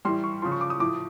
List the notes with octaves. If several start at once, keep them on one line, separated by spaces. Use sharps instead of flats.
A2 E3 G3 C6
C#6
C#3 F3 C6
C#6
D6
D#6
A2 F3 D6